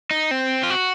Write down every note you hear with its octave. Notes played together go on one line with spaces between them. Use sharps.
D#4
C4
F4
F#4